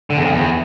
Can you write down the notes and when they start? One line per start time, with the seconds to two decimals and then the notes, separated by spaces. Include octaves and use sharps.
0.10 D3
0.17 E2
0.25 F2
0.32 E2